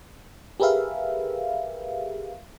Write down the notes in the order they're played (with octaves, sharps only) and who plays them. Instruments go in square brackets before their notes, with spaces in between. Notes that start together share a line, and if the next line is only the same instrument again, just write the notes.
[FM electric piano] G4 G#4 A#4 B4 E5 F5